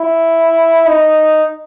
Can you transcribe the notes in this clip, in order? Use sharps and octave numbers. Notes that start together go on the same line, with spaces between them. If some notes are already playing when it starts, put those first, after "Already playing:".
Already playing: E4
D#4